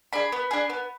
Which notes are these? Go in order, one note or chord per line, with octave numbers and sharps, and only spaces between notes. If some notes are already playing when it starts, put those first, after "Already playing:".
D4 G#4 B5
B3
D4 G#4
B3